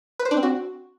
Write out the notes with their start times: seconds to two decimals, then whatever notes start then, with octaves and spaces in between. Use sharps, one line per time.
0.19 B4
0.25 C5
0.31 D4
0.37 C4
0.43 F#4